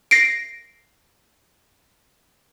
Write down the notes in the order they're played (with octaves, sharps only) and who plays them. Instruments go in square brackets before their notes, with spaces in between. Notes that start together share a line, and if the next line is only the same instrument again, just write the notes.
[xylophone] A#6 C7 D7